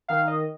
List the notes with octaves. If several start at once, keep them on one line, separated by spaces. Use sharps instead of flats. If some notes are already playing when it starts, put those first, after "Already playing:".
D#3 F5
D#5